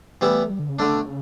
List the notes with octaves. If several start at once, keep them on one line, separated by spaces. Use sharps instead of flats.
E3 G3 A3 B3 E4
G3
D3
C#3
D3 A3 D4
B2
C#3